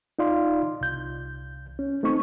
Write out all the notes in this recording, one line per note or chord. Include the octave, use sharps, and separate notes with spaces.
D#4 F4 D5 F5 C6
C2 G6
C#4
A3 C4 D#4 C#6